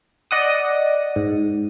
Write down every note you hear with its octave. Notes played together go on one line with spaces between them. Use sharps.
D5 D#5 F#5 D#6
G#2